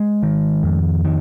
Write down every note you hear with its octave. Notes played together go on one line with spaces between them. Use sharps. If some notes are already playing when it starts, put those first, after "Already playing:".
Already playing: G#3
D#3
F2
D#3